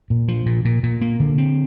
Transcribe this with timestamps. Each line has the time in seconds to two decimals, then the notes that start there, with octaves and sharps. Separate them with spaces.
0.10 A#2
0.28 F3
0.46 A#2
0.65 A#2
0.83 A#2
1.01 A#3
1.20 D3
1.38 C4